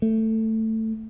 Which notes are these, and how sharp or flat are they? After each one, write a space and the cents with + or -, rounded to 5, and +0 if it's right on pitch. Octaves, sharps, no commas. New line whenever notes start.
A3 +15